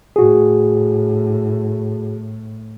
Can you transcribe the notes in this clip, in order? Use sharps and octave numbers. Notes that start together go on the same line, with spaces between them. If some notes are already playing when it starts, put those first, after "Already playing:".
A2 F#4 G#4